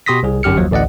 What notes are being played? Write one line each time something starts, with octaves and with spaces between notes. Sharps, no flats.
B2 G4 C6 D#6 A#6 B6
C2 G#4
G1 F#2 G4 F6 C#7
D#2 F3 F#3
A1 D2 D5 D#5 F#5